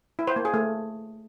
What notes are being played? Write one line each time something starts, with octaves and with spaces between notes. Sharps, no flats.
E4
C5
A#3
G#4
A3